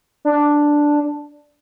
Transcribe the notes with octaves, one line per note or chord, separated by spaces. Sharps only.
D4